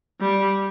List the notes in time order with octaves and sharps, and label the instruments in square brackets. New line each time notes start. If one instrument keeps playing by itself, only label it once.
[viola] G3